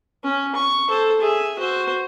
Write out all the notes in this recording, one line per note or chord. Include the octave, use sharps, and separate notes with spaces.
C#4
C#6
A4 C5
G#4 E5
F#4 C5